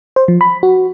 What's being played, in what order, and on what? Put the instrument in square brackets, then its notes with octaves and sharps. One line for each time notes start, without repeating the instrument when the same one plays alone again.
[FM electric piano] C5
F3
B5
F#4